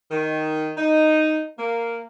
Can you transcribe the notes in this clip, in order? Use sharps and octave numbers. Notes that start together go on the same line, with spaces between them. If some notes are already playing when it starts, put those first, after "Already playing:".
D#3
D#4
A#3